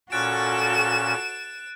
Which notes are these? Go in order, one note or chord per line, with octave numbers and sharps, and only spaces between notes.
A#2 C#4 F#4 A4 F#6 A6 D7 E7